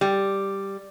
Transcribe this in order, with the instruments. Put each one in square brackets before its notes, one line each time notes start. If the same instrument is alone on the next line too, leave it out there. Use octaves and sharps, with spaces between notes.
[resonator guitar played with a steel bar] G3